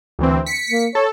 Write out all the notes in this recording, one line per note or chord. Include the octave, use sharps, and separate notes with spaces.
D2 E3 C4
B6 C#7
A#3
A4 C#5